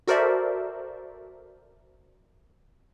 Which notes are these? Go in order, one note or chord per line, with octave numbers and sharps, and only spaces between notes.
F#4 A4 A#4 C5 D5 E5